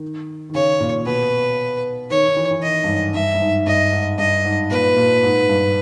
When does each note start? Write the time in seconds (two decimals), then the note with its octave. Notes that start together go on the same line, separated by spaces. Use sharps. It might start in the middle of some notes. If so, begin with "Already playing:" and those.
Already playing: D#3
0.50 D#3
0.54 C#3 C#5
0.80 A#2
1.06 B2 B4
2.10 D#3 C#5
2.26 D#3
2.36 E3
2.51 E3
2.62 D#3 D#5
2.84 G2
2.88 G#2
3.14 G2 E5
3.35 G2
3.41 G#2
3.67 G2 D#5
3.92 G#2
4.19 G2 D#5
4.45 G#2
4.71 A#2 B4
4.96 A#2
5.23 G#2
5.49 G2